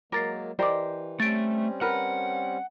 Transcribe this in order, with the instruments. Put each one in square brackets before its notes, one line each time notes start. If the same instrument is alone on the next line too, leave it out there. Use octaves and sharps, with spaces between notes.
[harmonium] F#3 G#3 A#3 [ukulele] A#4 [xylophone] D6 A6 C7
[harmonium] E3 [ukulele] G4 A#4 C5 [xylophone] D5 D#5 D6
[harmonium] G3 C4 C#4 [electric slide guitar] A3 [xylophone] A6 D7
[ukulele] A#4 B4 [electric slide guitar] F#5